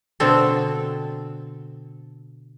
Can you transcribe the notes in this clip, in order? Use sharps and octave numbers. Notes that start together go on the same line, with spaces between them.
B2 D3 C4 A4